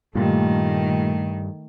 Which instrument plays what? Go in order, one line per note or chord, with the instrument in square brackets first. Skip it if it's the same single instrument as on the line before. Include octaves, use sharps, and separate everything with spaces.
[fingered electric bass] G2 [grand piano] A#2 G3 [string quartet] D#3 [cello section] A3